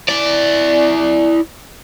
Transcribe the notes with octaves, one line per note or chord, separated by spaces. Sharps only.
E4 D5